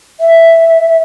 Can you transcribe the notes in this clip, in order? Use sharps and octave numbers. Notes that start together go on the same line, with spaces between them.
E5